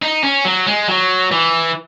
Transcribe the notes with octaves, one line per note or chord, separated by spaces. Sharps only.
D#4
C#4
F#3
G#3
F#3
E3